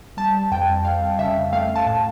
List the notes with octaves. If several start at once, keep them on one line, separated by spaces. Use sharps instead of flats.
G3 A5
F2 G5
F2 F5
C#3 E5
A3 F5
A5
A2